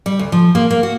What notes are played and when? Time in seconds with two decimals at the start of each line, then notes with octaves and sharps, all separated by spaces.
0.06 G3
0.19 D2
0.32 F3
0.55 A#3
0.71 A#3
0.83 F#4